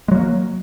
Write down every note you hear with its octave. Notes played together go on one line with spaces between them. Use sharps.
F#3 G#3 A#3